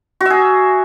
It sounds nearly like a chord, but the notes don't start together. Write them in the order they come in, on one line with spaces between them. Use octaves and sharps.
F#4 E5 G#4